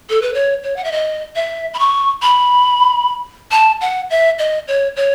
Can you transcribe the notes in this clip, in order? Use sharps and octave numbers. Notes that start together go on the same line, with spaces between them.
A4
B4
C#5
C#5
F#5
E5
D#5
E5
B5
C#6
B5
A5
F#5
E5
D#5
C#5
C#5